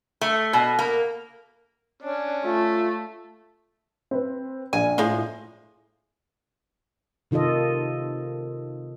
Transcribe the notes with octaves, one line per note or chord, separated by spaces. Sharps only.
A3
B2
A#3
C#4 D4
A3 F4
C4 B4
A#1 G#5
A2 F3 G#3
C3 D#3 F4 A4 D#5